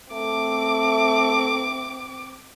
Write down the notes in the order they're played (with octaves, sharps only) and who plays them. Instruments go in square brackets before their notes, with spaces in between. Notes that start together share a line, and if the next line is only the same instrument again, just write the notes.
[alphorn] A3 [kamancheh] C4 D6